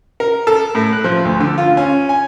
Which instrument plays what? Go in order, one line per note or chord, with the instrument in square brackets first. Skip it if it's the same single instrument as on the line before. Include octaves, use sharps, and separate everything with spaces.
[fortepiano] A#4
A4
A2
F#6
F3
D2
D3
F4
C#4
G#5